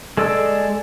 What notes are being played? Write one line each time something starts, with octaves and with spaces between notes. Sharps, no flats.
G#3 A4 D5 E6